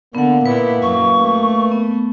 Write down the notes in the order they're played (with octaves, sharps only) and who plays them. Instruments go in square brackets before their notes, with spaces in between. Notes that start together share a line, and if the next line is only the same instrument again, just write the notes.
[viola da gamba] D3 [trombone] A#3 [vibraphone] B3 F#5
[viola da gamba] A#2 B3 E4 [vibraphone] B4
[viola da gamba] F#2 F#3 [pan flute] C#6
[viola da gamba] A3
[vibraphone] B3